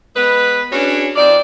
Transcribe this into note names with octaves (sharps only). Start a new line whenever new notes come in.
G#3 B3 G#4 B4
C#4 D4 F#4 G#4 B4 C#5
F3 C4 D#4 D5